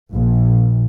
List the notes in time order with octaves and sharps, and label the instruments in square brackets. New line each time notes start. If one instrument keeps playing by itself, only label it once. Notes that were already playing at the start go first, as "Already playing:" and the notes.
[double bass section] A#1